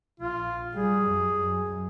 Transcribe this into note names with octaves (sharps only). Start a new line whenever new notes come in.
A#1 F4
G3 G#4
F#2
F#2